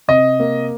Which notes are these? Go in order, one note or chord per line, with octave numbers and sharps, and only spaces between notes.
C3 D#5
A#3